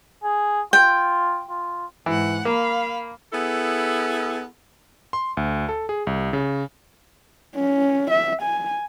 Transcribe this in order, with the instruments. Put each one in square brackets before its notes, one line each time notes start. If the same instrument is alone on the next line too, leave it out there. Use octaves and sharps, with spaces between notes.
[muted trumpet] G#4
[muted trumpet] F4 [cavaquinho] G5
[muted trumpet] F4
[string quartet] G#2 F#5 [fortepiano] E3
[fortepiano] A#3 [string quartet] F5 B5
[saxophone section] B3 E4 G#4 A4
[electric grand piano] C6
D2
A4
G#4
C2
C#3
[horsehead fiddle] C#4
E5
G#5